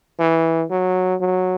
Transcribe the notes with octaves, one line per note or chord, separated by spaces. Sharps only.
E3
F#3
F#3